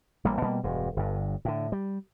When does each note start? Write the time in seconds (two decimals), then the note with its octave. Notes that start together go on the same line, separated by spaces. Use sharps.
0.25 A1 G3 A#3
0.42 B2 G3 A#3
0.63 E1 G2
0.97 G1 G2
1.45 A2 D3
1.72 G3